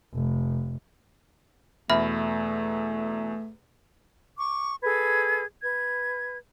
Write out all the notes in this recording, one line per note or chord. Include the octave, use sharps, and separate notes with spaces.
F1
E2 B2 A3 E5 B5 F6
C#6 D6
G#4 A4 B4 G#6
B4 G#6